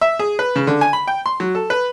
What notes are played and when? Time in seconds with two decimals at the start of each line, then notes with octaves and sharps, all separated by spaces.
0.01 E5
0.19 G#4
0.39 B4
0.56 C#3
0.67 D3
0.81 G#5
0.93 B5
1.07 G5
1.26 C6
1.40 F#3
1.55 A4
1.70 B4